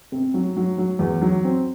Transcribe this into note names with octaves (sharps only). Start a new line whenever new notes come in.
C3
F#3
F#3
F#3
E2
F#3
C4